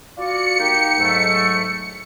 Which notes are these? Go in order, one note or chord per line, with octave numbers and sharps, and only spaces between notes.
F4 F#4 D5 C#7
A#3 D#4 G4
G#2 F#3 A3